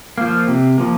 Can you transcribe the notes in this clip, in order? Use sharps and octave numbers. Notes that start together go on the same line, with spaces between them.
F3 A#3
C3
F3 A#3